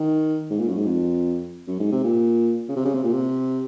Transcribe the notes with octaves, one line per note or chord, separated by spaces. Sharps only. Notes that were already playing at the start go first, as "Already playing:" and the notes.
Already playing: D#3
G#2
A#2
F#2
G#2
F2
F#2
G#2
C3
A#2
C#3
C3
C#3
C3
A#2
C3